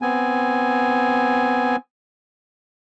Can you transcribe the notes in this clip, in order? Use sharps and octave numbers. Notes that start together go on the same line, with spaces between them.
B3 C4 G#5